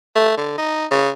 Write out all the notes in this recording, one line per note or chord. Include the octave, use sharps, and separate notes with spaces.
A3
D3
D#4
C#3